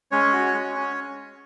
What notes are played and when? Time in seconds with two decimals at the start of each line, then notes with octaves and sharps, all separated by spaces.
0.11 G#3 C#4 C#5
0.33 F#4
0.54 G#3
0.75 C#4